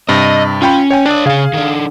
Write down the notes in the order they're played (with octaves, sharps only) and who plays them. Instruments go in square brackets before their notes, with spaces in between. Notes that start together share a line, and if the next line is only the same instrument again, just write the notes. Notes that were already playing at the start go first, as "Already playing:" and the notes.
[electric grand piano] G2 C3 [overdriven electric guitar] D#5
[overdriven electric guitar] C#4 [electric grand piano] F4 G5 B5
[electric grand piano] C#5 G5 G#5
[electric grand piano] D4 [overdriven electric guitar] C#5 D#5
[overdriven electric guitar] C#3 G#5 [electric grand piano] G#4 F5
[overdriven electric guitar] D#3 D4